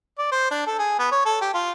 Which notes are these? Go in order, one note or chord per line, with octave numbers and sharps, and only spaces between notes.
D5
C5
D4
A4
G#4
B3
C#5
A4
G4
F4